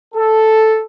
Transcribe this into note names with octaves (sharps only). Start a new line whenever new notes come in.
A4